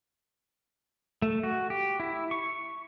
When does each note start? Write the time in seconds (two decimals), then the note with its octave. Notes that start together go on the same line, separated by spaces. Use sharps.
1.22 A3
1.43 F#4
1.70 G4
2.00 E4
2.31 C#6